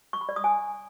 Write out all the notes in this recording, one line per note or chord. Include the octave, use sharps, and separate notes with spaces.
C#6
B5
D5
D#6
G#5